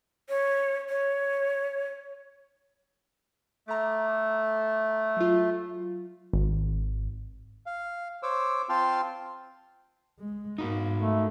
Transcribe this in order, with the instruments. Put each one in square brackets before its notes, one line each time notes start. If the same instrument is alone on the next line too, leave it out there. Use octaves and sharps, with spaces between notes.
[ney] C#5
C#5
[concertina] A3 [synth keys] A#5 D6
[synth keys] F#3 F4
[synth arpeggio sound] G#1
[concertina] F5
C5 C#5 D6 E6
C4 F4 G5 A5 C6 F6
[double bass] G#3
[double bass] G#2 A#3 [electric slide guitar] D#4 F#4
[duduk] A3